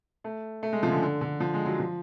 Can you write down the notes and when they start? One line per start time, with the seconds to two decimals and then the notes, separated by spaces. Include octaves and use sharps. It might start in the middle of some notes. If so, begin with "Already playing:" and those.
0.24 A3
0.63 A3
0.73 G#3
0.83 F3
0.87 C#3
0.92 D3
1.02 D3
1.21 D3
1.40 F3
1.54 G#3
1.65 F#3
1.79 F3